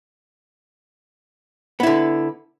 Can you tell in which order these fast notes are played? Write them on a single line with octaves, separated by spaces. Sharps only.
B3 E4 D3